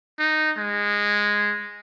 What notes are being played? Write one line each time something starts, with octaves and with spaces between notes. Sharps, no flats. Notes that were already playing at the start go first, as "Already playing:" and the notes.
D#4
G#3